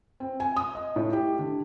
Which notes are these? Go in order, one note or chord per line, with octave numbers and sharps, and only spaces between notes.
C4
G#5
D#6
D#5
A2
G4
D3